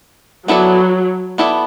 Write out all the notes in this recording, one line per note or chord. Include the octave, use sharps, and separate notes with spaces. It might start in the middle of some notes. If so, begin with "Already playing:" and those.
F#3 B3 E4 A4 D5
B3 E4 A4 D5